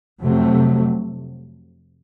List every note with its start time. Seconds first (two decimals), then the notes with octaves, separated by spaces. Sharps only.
0.23 F2 C3 F#3 A3